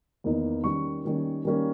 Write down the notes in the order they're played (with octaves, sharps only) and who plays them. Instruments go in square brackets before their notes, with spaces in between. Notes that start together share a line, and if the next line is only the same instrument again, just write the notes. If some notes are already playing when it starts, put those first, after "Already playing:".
[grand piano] E2 D#3 A#3 D#4
D#3 G3 A#3 C#4 C#6
D#3 G3 A#3 C#4
D#3 G3 A#3 C#4